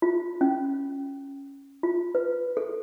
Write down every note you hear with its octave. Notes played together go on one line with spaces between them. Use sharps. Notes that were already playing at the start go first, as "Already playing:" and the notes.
F4
C#4
F4
B4
A4